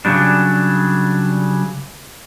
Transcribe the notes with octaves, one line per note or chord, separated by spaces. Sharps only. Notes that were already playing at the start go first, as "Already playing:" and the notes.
C#3 F#3 G3 D4